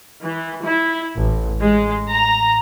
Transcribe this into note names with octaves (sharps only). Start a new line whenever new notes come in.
E3
E4
A1
G#3
A#5